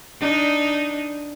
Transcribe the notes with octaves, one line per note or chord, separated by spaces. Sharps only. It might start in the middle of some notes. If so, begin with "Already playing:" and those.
D4 D#4